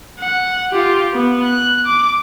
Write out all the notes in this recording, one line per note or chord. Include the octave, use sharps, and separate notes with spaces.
F#5
F4 G4
B3
F#6
D6